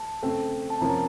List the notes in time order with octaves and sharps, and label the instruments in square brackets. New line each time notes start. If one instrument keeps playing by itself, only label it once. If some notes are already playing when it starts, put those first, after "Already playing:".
Already playing: [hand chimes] A5
[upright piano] C#3 A3 C4
[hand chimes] A5
[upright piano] C3 F3 A#3 C#4 [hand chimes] A#5